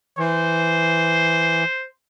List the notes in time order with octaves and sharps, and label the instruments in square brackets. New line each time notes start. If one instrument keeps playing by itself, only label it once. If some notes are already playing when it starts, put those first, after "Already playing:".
[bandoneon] E3 [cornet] C5